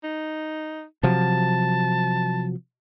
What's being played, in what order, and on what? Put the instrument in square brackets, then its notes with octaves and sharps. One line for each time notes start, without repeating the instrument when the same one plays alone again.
[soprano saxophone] D#4
[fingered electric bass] C3 F3 F#3 [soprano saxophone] A5